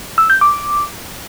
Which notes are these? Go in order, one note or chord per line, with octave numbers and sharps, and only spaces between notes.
E6
G6
D6